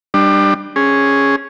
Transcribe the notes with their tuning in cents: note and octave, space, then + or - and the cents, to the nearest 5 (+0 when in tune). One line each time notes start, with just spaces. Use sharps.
G3 +0 D4 +25
C#4 +0 G#4 +0